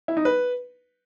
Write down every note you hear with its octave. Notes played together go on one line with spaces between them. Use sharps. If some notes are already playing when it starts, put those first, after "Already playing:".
E4
D#4
B4